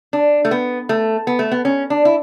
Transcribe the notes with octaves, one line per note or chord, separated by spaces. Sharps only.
D4
A3
B3
A3
B3
A3
B3
C#4
D4
E4